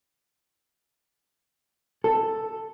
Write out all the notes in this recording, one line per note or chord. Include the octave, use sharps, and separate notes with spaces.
A4